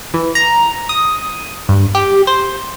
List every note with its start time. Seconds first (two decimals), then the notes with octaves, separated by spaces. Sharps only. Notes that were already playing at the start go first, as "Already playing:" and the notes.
0.14 E3
0.35 A#5
0.89 D#6
1.69 G2
1.95 G4
2.27 C5